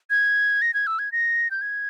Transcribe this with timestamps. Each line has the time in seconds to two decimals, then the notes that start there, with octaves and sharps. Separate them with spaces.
0.10 G#6
0.62 A#6
0.74 G#6
0.87 E6
0.99 G#6
1.12 A#6
1.51 G6
1.61 G#6